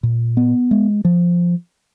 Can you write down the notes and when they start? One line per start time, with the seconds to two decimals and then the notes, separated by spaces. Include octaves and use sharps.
0.03 A#2
0.37 B3
0.71 G#3
1.05 F3